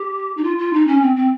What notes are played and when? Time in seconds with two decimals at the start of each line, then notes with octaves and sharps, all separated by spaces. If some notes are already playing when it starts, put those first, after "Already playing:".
Already playing: G4
0.37 D#4
0.44 F4
0.58 F4
0.73 D#4
0.87 C#4
1.02 C4
1.16 C4